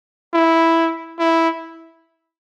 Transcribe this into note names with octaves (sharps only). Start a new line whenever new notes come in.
E4
E4